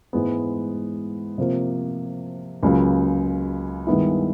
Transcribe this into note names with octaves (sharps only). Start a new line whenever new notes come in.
G#2 E3 G#3 B3
C3 F3 A#3
C#2 C#3 F#3 A#3
G2 D#3 G#3 B3 E4